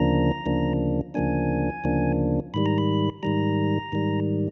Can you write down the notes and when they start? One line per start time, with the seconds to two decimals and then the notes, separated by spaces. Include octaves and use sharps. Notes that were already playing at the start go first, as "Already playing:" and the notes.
Already playing: D2 C#3 F3 A#3 D4 A#5
0.46 D2 C#3 F3 A#3 D4
1.14 D2 C#3 F3 A#3 D4 G#5
1.84 D2 C#3 F3 A#3 D4
2.54 G#2 D#3 G3 B5
2.66 A#5
2.78 B5
3.23 G#2 D#3 G3 A#5
3.92 G#2 D#3 G3